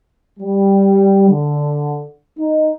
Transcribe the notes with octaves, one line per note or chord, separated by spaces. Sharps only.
G3
D3
D#4